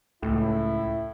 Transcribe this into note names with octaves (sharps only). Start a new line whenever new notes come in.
C#2 A2 E4